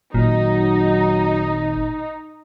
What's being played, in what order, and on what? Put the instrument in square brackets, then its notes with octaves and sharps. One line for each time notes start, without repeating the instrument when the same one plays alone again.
[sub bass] G#1 [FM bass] A#2 [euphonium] F#3 [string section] D#4